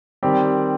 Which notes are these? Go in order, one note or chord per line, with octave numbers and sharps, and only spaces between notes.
D#3 G3 C4 G4